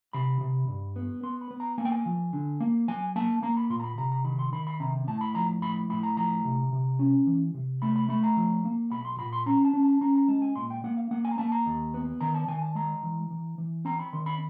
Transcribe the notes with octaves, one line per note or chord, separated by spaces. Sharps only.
C3 B5
C3
G2
B3
B3 C6
B5
B3
A#5
A#3 G#5
G5
G#5
F3
D3
A#3
F#3 G#5
A#3 A5
A#3 A#5
B5
A#2 C6
A#5
B5
C3 A#5
A#5
D#3 B5
C6
D#3 B5
B5
C3 A#5
A2 A5
B5
F3 A#5
A2 B5
A2 B5
A#5
F3 A#5
C3
C3
C#4
E3
C3
A3 B5
B5
A3 B5
A#5
F3
A#3
B1 B5
C6
A#2 B5
C6
C#4 A#5
A5
C#4
A5
C#4 A#5
A#5
G#3 A5
G#5
A#2 C6
G5
A#3 F#5
F5
A#3 F#5
G#5
A#5
A#3 A5
A#5
D#2
B3
D#3 A#5
A5
D#3 G#5
A5
G#3 A#5
E3
E3
E3
C4 A#5
B5
D#3 C6
B5